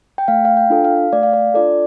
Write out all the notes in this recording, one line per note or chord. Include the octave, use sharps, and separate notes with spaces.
G5
A3 F5
F5
G5
D4 F4 A4
F5
A3 D5
F5
D5
D4 F4 A4 D5